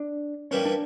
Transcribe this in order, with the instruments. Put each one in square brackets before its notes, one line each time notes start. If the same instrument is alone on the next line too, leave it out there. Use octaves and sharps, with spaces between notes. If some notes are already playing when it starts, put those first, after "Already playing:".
Already playing: [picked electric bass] D4
[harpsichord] G2 E3 G3 A#3 D#4 [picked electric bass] C#4
[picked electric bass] D4